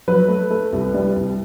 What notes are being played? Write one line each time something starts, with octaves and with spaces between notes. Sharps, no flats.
F#3 B4
A3
A3
C2
G3
C2